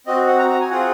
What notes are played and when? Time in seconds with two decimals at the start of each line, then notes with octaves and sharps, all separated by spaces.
0.07 C4 F#4 D#5
0.28 F#5
0.39 A#5
0.50 A#5
0.60 G#5
0.70 C4 F4 G#4 F#5